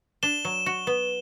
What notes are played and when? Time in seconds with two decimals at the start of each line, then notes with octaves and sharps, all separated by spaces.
0.23 D4 E7 G7
0.45 F#3
0.66 F#4
0.87 B3